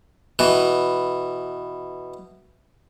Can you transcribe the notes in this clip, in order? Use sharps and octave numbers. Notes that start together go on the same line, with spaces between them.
B2 E3